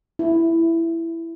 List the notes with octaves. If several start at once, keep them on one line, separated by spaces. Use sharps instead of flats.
E4